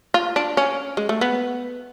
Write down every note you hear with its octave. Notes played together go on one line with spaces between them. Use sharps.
F4
D4
C#4
G#3
A3
B3